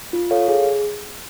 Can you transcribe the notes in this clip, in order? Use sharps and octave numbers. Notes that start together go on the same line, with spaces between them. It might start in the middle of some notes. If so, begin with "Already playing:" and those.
F4
A4 C#5 F5
G#4